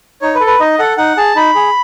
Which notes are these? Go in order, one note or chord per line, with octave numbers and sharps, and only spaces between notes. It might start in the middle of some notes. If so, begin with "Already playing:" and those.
D#4 C#5
B4
A4
B4
D#4 D#5
A4 F#5
D#4 F#5
G#4 A5
D#4 B5
G#4